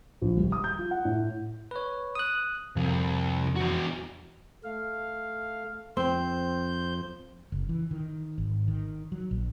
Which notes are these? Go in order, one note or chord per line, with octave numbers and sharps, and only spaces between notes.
A#1
D#1
D#6
G6
F4
F#5
A2
B4 C#5
D#6 F#6
C2 F2
E2 F#4
A3 F5
F2 C4 C5 G6
F#1
E3
D#3
G#1
D#3
F#3
A#1